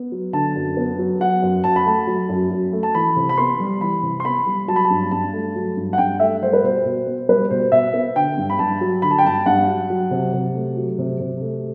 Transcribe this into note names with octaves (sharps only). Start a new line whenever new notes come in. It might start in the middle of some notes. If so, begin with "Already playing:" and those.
Already playing: B3
F#3
D3 A5
F#2
B3
F#3
F#3 F#5
F#2
F#2 A5
B5
A3 A5
F#3
F#2
F#2
A3
A5
E3 B5
C3
B5
B3 C6
G3
E3 B5
C3
C6
B3 B5
G3
F#3 A5
B5
A5
G2
G2 A5
A3
F#3
G2
F#5
G2 G5
A3 E5
G3 C5
B4
B2 C5
B2
B3
G3 B4
B2 C5
B2 E5
B3
D3 G5
G2
B5
G2 A5
F#3
D3 B5
A5
G5
G2 A5
G2 F#5
F#3
F#3
C3
C3
A3
F#3
C3
C3
A3